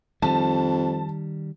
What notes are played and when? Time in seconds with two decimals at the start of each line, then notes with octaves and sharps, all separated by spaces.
0.22 F2 D#3 G3 A5